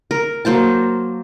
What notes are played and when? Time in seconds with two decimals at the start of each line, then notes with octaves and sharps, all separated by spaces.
0.11 A#4
0.45 F#3 A#3 C5 A5